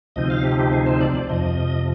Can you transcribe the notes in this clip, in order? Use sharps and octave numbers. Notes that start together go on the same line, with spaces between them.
D2 C3 F3 C4 D#4 D#5
F5
G4
G4
G#4
C5
D5
D5
F2 C3 F3 D#5